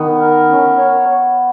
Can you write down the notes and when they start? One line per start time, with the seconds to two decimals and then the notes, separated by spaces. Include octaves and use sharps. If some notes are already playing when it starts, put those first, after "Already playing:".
Already playing: D#3 B3
0.20 A#4
0.50 C#4
0.78 C#5